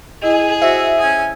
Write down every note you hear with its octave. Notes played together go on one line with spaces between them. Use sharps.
E4 G#4 D#5
F#4 C5 E5
C#4 G#5 D#6